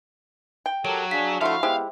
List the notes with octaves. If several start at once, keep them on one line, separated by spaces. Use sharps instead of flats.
G5
F#3 G4 A4 A#4 D7
D4 G#4 F5 B6
D3 F3 A3 E4 F#4 E5 F5 C6
G#3 B3 E4 G4 C5